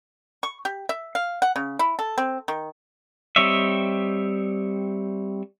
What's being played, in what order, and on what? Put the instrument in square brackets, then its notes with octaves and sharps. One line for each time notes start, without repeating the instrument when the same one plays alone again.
[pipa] C#6
G4
E5
F5
F#5
C#3
E4
A4
C4
D#3
[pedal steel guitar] G3 C4 C#5 D#5 E5